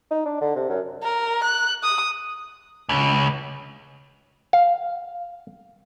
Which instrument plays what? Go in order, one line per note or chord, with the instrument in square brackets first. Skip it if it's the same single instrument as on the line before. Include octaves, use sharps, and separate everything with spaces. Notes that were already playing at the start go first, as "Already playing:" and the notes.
[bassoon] D#4
D4
D3
C3
F#2
[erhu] A#4
F#6
D#6
[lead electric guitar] C#2
[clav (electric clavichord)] F5